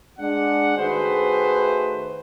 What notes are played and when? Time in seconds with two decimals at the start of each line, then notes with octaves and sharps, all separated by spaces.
0.19 G#3 D4 F#5
0.77 D#3 A3 F#4 G#4 B4 C5